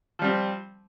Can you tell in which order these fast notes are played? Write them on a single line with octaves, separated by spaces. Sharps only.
F3 G3 C4